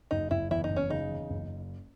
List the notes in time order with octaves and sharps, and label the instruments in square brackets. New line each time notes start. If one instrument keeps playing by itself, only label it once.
[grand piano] F#1 [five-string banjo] D#4
[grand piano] F#1 [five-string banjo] E4
[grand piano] E2 [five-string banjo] E4
[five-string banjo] D#4
[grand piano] F#1
[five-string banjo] C#4
[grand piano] C#3 [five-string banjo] D#4
[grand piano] E2
F#1